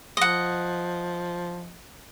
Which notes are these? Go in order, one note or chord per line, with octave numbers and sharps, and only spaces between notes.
F3 D#5 F#5